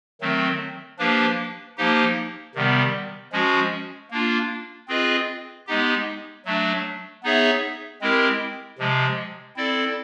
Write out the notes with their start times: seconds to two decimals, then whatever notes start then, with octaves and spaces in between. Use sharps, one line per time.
0.21 D#3 F#3 A3 C4
0.98 F3 A#3 D4 G4 B4
1.77 F3 A#3 D#4 G4
2.55 C3 D#3 G3 B3
3.32 F3 G#3 C#4 F#4
4.11 A#3 D4 F4
4.88 C4 F4 G#4 B4 D#5
5.67 G#3 B3 D#4 G4
6.45 F#3 A3 D4
7.23 B3 D#4 G#4 C#5 E5
8.01 G#3 C4 E4 G4 A#4
8.79 C3 F3 G#3
9.57 C4 E4 A4 D5